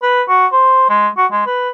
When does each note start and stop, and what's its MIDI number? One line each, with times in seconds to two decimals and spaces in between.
0.02 0.22 71
0.28 0.46 66
0.52 0.88 72
0.89 1.08 56
1.17 1.26 66
1.31 1.43 56
1.46 1.69 71